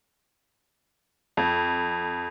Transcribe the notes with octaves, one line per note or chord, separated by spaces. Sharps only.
F2